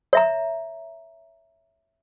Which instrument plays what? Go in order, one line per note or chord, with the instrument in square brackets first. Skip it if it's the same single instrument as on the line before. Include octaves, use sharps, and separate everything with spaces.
[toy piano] C#5 E5 A#5